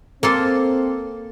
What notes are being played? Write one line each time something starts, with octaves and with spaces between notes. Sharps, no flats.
A#3 C4 A4 C6